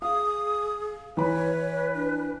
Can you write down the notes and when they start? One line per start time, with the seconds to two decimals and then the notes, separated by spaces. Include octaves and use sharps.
0.02 G#4 F5 D#6
1.17 E3 B4 C#5 B5
1.94 D4